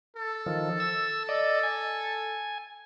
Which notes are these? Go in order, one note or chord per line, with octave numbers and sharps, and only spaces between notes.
A4
D#3 F3
E6
D5 D#5
G#5